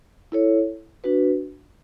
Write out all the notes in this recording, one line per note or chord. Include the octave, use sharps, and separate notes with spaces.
E4 A4 C#5
D4 F#4 B4